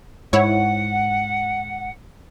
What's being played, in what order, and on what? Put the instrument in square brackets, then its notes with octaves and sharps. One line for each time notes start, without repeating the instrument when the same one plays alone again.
[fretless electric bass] G#2 [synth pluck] E4 C#5 [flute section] F#5